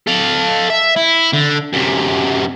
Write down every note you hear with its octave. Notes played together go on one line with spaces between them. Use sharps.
A4 F5
E5
E4
D3
F#2 C3